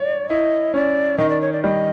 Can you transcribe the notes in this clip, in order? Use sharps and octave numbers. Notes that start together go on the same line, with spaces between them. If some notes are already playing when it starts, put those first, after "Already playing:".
Already playing: C#5 D5
E4 D#5
C#4 D5
D#3 D#5
D5
C#5
D5
G3 D#5